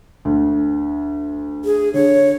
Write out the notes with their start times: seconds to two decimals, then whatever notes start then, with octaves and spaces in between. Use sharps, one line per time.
0.25 D2
1.65 G#4
1.94 D3 C#5